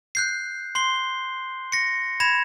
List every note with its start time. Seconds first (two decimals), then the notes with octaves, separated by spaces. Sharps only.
0.15 F#6 G6 C7
0.75 C6 C7 G7
1.72 A#6 C#7
2.20 B5 G#6 A#6 E7